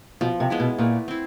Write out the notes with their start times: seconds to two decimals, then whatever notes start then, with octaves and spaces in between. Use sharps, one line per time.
0.21 B2 F3
0.40 C3
0.50 G#3 B3 E4
0.60 B2
0.78 A#2 A3
1.08 C4 E4